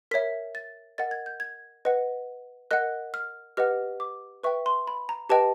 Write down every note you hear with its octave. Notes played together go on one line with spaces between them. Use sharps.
A#4 C#5 E5 B6
A6
A#4 D#5 F#5 A6
G#6
G6
G#6
B4 D#5 F#5
A#4 D#5 F#5 F#6
F6
G4 B4 D#5 F#5 F6
D6
B4 E5 G5 C#6
C6
B5
A#5
G4 B4 D#5 G5 A5